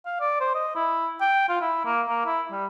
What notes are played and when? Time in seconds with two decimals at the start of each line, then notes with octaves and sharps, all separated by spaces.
0.06 F5
0.20 D5
0.40 C5
0.54 D#5
0.76 E4
1.21 G5
1.49 F4
1.61 E4
1.85 A#3
2.09 A#3
2.26 E4
2.51 G3